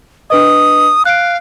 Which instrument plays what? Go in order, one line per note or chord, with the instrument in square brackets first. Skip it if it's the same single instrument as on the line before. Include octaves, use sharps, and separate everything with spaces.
[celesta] D4 B4 D#5 [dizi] D#6
[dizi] F5 [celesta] F#6 D7